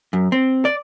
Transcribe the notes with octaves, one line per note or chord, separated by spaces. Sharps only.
F#2
C4
D5